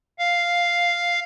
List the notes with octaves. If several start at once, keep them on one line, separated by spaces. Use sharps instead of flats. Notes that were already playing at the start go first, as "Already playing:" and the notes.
F5